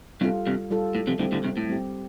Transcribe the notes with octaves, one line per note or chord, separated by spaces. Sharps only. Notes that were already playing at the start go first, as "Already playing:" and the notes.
G2 C3 G3 F4 A4
G2 C3
G3 F4 A4
A2
C3 F3
A2 D3 G3 C4 G4
A2 D3
G2 C3
A2
G3 C4 G4